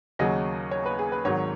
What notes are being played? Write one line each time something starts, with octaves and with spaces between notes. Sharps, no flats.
D#2 C#3 F#3 D#5
C#5
B4
G#4
B4
G#1 G#2 D#3 F#3 C#5